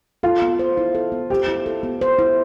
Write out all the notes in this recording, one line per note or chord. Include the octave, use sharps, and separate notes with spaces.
F4 A4
B3
C5
E4
A4
B3
G4 C5
E4
A4
B3
C5
E4